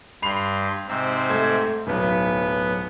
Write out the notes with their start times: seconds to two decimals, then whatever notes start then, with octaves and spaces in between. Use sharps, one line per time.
0.22 G2 B5 C6 C7 F7
0.88 G#2 C3 C4
1.30 A3 G#6
1.87 D1 B1 B3